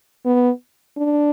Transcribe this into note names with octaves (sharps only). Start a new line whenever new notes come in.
B3
D4